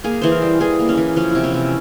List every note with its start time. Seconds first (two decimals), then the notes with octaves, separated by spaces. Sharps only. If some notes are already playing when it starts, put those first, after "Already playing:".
0.04 A#3 G#4
0.21 E3 C5
0.32 A#4
0.42 G3
0.60 E3 G#4
0.79 A#3
0.89 C#4
0.97 E3
1.16 F3 C#4
1.30 C3 E4
1.44 C#4
1.54 C3